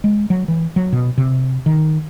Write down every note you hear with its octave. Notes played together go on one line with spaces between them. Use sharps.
G#3
F#3
E3
F#3
B2
C3
D#3